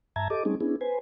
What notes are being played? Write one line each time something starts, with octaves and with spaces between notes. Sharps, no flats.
G2 E5 A5 A#5 G#6
G4 A4 D#5 D6
G3 A3 C4 C#4 D#4 G#4
B3 C#4 D4 E4 G#4
B4 C5 G#5